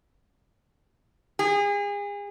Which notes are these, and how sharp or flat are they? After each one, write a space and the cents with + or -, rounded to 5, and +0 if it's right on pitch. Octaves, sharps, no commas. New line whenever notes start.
G#4 -35